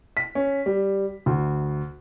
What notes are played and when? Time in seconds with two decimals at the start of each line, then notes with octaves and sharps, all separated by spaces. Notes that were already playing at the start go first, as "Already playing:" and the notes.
0.17 B6
0.35 C#4
0.66 G3
1.26 D2